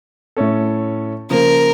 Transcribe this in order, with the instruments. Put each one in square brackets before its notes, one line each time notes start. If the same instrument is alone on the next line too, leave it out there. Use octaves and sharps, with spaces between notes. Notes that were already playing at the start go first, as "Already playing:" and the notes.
[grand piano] A2 A3 C#4 A4
[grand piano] C#3 F3 A#3 [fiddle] A#4